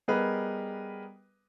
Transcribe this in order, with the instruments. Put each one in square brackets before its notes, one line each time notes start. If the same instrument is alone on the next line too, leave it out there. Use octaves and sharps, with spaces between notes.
[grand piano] G3 B3 G#4 A#4 B4 D#5